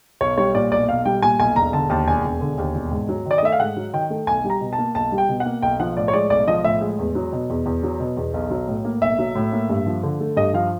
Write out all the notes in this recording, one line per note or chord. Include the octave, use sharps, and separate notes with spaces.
B1 C#5
G3 C#5
A#2 D5
B1 D5
B1 F5
G3 G5
A#2 G#5
B1 G#5
E1 A#5
D3 A5
D#2 A5
E1 G#5
E1
D3
D#2
E1
G#2
F#3
D#3 D5
D#5
A3 E5
F5
G#2 F#5
F#3
D#3 G5
A3
B1 G#5
G3
A#5
B2
A5
A#3
B1 A5
G3
G5
B2
F#5
A#3
B1 G5
F3 F#5
A2 D5
C#5
G#3 D5
B1 D5
F3 D#5
A2 E5
G#3
E2
F#3
B2
E2
E2
F#3
B2
E2
B1
F#3
A2
A#3
B1 E5
F#3
A2
A#3
G2
F3
D3
A3
G2 D#5
F3 F5